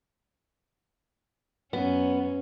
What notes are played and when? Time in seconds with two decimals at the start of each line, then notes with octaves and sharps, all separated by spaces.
1.73 F#2 B3 C#4